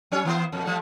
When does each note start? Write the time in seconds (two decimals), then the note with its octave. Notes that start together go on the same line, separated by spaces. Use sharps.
0.12 F#3 C#4 C#5
0.25 E3 B3 C5
0.52 F2 B2
0.64 F3 G3 A3